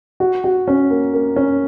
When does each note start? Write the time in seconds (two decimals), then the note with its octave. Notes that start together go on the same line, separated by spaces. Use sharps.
0.20 F#4
0.44 F#4
0.68 C#4
0.90 A#3
1.13 A#3
1.36 C#4